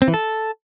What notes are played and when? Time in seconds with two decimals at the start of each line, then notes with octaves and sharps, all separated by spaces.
0.02 C4
0.08 E3
0.14 A4